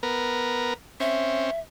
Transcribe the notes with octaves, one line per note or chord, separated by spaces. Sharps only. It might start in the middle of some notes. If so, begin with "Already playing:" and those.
B3 A#4
C4 C#4 E5